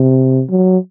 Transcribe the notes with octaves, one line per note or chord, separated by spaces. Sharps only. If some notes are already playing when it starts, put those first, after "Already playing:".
Already playing: C3
F#3